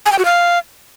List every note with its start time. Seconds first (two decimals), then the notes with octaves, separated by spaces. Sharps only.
0.06 G#5
0.12 G5
0.19 F#4
0.25 F5